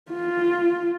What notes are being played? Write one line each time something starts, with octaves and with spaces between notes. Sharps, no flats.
F4